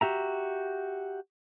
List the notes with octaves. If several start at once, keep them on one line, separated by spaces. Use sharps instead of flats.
F#4 G4 E5 A#5